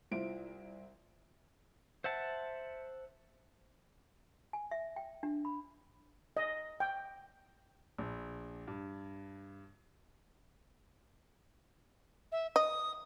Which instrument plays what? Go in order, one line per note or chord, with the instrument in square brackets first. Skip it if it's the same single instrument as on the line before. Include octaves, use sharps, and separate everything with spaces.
[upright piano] C2 E4 F4 C5 D7
[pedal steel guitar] C5 E5 F#5 A5
[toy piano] G#5
E5
G5
D4
B5
[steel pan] D#5
G5
[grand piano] A#1
G2
[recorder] E5
[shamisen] D#5 [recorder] D#6